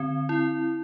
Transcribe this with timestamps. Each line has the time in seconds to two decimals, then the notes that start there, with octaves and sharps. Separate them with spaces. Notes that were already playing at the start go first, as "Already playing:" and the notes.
Already playing: D3 C4
0.29 E4